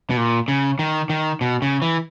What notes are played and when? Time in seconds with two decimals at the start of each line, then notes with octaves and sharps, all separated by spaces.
0.10 B2
0.17 A#2
0.48 C#3
0.79 D#3
1.10 D#3
1.41 B2
1.62 C#3
1.82 E3